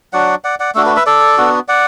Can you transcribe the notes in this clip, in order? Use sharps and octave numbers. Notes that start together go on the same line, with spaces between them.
F#3 D4 F#4 D5 F#5
D5 F#5
D5 F#5
A3 D4 F#4 A4
F#4 B4
B4 E5
A4 D5
B3 D4 F#4
D5 F#5